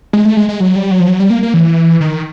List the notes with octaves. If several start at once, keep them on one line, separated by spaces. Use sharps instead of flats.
G#3
A3
G#3
G#3
F#3
G3
F#3
F3
F#3
G3
A#3
A#3
E3
D#3